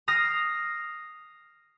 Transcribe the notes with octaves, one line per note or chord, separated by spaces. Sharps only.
D#6 F6 A#6 C7